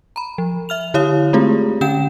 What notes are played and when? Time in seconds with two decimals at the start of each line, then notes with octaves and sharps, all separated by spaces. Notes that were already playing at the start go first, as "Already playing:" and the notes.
0.16 A#5 B5
0.38 F3
0.69 E5 F6 F7
0.94 D3 E4 G4 C#5 F5 D#6
1.33 G#3 A3 C4 F4 G4 G#4
1.81 D3 C#4 G5 G6 E7